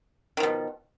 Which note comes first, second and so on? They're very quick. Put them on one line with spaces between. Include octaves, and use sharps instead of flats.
D#3 F3 B2